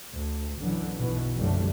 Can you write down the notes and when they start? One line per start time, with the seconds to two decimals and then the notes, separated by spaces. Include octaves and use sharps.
0.13 D2
0.60 B1 F#2 D3 E3
0.99 B1 B2 E3
1.37 F#1 F#2 D3 G3 A3